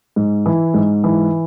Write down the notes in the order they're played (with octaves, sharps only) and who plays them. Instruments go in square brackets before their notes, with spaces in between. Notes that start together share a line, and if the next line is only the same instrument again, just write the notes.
[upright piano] G#2
E3
G#2
E3